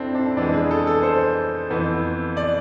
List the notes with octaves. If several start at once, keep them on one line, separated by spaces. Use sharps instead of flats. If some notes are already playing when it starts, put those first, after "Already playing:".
Already playing: F2 C4 D4 E4 A4
D4
F2 E3 G#3 B3 D4
G#4
A4
A4
C5
F2 E3 B3
D5